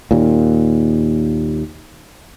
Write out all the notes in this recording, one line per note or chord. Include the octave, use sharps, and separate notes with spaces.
D#2 A#2